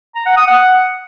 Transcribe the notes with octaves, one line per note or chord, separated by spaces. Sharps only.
A#5
F#5
D#6
F#5